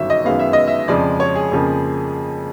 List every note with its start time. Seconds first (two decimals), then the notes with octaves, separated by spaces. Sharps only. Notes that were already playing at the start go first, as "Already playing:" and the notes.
Already playing: G1 F#2 D#3 F#3 E5
0.10 D#5
0.25 F#2 D#3 G#3 B3 F5
0.39 E5
0.53 D#5
0.68 E5
0.88 F2 C#3 F3 G#3 D5
1.20 C#5
1.35 G#4
1.52 F2 C#3 F3 A#3